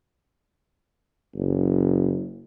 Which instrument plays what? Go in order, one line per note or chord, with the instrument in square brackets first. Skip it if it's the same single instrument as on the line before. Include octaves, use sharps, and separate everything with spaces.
[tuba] F#1